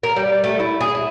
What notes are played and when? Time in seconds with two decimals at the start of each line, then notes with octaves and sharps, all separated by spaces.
0.03 A#4
0.16 G3
0.44 A3
0.60 E4
0.81 G#4
0.95 E4